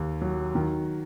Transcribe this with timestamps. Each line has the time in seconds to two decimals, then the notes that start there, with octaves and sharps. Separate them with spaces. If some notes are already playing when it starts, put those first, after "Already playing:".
Already playing: D#2
0.21 F#3
0.55 D#3